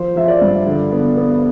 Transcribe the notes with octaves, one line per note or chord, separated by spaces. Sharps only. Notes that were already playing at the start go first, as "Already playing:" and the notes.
Already playing: F3 C5
F3 E5
D5
G2
D3
B3
B3